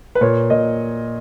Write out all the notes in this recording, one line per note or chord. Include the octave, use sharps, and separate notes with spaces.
B4
A#2 C#5
A#2 D#5